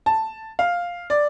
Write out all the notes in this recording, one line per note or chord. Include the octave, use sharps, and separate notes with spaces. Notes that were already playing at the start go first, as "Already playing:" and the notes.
A5
F5
D5